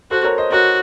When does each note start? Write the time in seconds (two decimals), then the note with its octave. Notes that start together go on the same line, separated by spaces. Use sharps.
0.11 F#4 A4 C5
0.24 A#4 C#5
0.38 C5 D#5
0.52 F#4 A#4 C#5